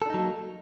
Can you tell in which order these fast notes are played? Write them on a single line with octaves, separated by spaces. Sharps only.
A4 D4 D#4 F#3 A#3